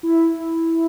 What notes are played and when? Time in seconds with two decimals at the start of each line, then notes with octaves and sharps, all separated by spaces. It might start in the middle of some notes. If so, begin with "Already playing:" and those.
0.03 E4